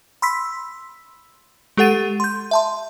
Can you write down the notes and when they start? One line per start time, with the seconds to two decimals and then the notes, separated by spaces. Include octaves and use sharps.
0.22 B5 C6 E6 B6
1.77 G#3 G4 A4 F#5 A6 D#7
2.20 C6 G6
2.51 E5 A5 C6